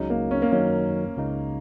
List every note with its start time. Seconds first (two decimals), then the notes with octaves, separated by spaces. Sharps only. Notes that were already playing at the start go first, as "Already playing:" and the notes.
Already playing: C#2 C#3 F#3 D#4
0.10 A#3
0.31 C#4
0.42 A#3
0.52 F#2 D#3 F#3 C#4 D#4
1.17 C#2 C#3 A#3 D#4